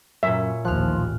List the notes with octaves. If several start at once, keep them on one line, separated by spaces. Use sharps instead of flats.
F#2 A#2 C#4 E5
A1 D#2 F3 F6 F#6